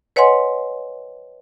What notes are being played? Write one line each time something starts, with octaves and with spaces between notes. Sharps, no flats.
B4 C#5 D#5 F#5 G#5 C6